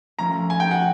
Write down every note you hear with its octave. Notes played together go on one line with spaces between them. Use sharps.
F3 A3 C#4 A#5
G#5
G5
F#5